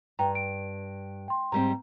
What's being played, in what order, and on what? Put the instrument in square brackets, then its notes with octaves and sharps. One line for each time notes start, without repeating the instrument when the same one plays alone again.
[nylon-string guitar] G2 [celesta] G5 A#5
[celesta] D7
G5 C6
[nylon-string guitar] G#2 G3 C4 [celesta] A#5